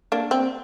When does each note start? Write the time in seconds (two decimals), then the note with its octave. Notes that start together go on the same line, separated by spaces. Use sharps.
0.12 A#3 D4
0.31 C4